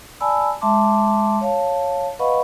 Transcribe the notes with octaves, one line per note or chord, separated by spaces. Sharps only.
D5 G#5 A5 B5 E6
G#3 E5 A5 C6 D6
C#5 F5 A5
B4 D#5 F5 F#5 B5 C#6